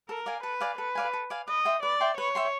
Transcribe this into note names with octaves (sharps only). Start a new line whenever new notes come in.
A4 A#4
D5 F5 G#5
A4 B4
D5 F5 G#5
A4 B4
D5 F5 G#5
A4
D5 F5 G#5
B4 D#5
E5 G5 C6
B4 D5
E5 G5 C6
B4 C#5
E5 G5 C6